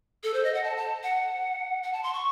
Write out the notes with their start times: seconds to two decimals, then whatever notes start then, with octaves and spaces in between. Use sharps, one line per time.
0.24 A4
0.34 C5
0.44 D#5
0.54 F#5
0.64 A5
0.77 A5
1.03 F#5
1.83 F#5
1.93 A5
2.03 C6
2.13 C#6